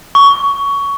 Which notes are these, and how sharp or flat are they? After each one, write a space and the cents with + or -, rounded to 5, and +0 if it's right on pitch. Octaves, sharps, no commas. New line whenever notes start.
C#6 +15